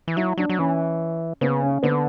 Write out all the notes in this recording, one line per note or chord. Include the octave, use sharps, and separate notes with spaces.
E3
F#3 E4
F#3 D4
F#3
E3 C#4
C#3 B3
C#4
D3 B3